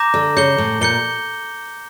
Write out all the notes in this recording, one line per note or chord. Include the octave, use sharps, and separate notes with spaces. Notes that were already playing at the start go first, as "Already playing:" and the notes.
Already playing: A#5 D6 G6 A#6 E7
D3
C#3 G6 C#7 G7
A2
A#2 G6 C#7 G7